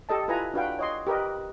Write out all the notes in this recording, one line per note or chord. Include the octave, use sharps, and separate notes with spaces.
G4 A4 D#5 A5
E4 F4 B4 G#5 A#5
D4 F4 F#4 B4 F5 G5
C#5 D#5 C6
G4 A#4 B4 D#5